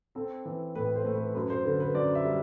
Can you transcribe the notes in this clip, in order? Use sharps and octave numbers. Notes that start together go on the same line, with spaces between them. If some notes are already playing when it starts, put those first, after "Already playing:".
C4 A4
E3
A2 B4
C5
A3
B4
F#2 B4
C5
D3 B4
B4
F#2 D5
E5
G3